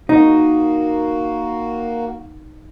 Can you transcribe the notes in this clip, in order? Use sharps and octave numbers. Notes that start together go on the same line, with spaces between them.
A#3 D#4 F#4